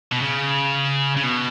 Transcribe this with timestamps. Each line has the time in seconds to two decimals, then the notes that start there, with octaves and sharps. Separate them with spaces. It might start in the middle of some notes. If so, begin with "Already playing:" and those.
0.12 B2
0.22 C#3
1.17 C#3
1.23 B2